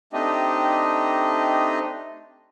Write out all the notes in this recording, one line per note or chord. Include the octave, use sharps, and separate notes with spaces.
A3 C4 D4 D#4 G4 D#5